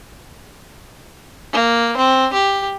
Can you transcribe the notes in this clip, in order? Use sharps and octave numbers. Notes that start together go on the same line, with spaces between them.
A#3
C4
G4